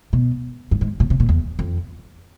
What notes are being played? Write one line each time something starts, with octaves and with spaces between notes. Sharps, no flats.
B2
G2
G#2
A#2
C3
A#2
E2
F2